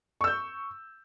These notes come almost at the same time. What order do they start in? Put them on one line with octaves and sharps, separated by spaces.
C#6 E6 G6